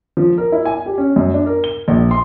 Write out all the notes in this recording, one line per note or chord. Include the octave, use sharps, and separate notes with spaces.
F3
A#4
E4
G#5
G4
C#4
F#2
D4
A#4
G7
A#1
C6